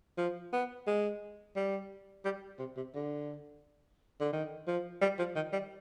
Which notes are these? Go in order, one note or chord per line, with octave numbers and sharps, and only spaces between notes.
F3
B3
G#3
G3
G3
C3
C3
D3
D3
D#3
F3
G3
F3
D#3
G3